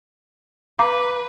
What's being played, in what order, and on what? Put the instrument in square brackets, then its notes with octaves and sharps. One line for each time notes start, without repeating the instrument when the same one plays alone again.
[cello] B4 [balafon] F5 A#5 D6